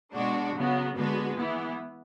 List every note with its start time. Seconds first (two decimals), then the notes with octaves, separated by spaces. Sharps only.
0.15 B2 G#3 D4 F#4
0.55 C#3 F#3 B3 F#4
0.96 D3 G#3 B3 F#4 B4
1.37 E3 B3 E4